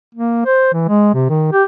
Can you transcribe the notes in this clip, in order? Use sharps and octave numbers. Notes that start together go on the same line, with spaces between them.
A#3
C5
E3
G#3
C3
D#3
G4